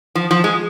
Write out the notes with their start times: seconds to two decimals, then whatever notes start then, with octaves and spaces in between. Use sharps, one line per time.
0.15 F3
0.31 F3
0.44 G#3